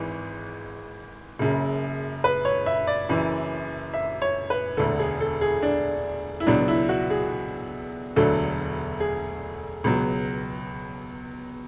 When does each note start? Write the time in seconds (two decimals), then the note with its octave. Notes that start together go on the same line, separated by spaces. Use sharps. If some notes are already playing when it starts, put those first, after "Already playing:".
Already playing: G#1 G#2 E3
1.39 F#1 F#2 C#3
2.24 B4
2.45 C#5
2.66 E5
2.87 D5
3.09 F#1 F#2 E3
3.94 E5
4.22 C#5
4.50 B4
4.77 E1 D2 D3 A4
4.99 G#4
5.20 A4
5.41 G#4
5.62 D4
6.40 E4
6.46 C#2 B2 F#3 D4
6.68 E4
6.89 F#4
7.10 G#4
8.16 E1 D2 D3 F#3 A4
9.00 G#4
9.84 C#2 B2 F#3